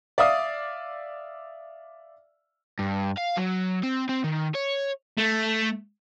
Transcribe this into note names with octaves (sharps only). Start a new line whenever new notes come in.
D5 E5 F5 D#6
G2
F5
F#3
C4
C4
D#3
C#5
A3